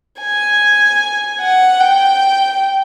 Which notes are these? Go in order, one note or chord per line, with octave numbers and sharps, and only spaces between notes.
G#5
F#5
G5